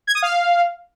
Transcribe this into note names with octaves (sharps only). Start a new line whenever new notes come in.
G#6
D#6
F5